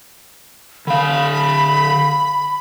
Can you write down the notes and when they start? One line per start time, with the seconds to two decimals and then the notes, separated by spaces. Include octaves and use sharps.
0.87 D3 F5 B5